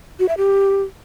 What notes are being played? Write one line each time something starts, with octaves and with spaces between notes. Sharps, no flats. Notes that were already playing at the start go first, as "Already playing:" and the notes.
F#4
E5
G4